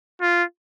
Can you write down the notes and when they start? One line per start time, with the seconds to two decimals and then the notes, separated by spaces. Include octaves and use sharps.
0.22 F4